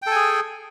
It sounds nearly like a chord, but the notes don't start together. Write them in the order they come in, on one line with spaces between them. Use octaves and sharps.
G5 A4 G#5 G#4